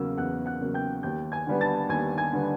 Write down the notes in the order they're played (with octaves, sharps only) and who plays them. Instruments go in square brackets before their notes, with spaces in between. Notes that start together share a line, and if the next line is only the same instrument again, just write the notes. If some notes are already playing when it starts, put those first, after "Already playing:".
Already playing: [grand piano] E2 C#3 F#3 A#3 E6
E2 F#5 F#6
F#5 F#6
C#3 F#3 A#3
G5 G6
D#2 G5 G6
G#5 G#6
D3 G3 B3
A5 A6
D#2 G#5 G#6
G#5 G#6
D3 G3 B3